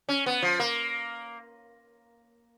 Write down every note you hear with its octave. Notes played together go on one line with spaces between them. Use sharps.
C#4
B3
F3
A#3